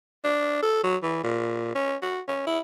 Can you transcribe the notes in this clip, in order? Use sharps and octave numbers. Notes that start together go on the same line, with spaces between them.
D4
A4
F#3
E3
A#2
C#4
F#4
C#4
E4